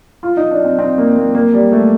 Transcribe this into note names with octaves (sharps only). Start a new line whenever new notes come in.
F4
D#4
D4
C4
C4
A#3
A#3
A#3
G3
A3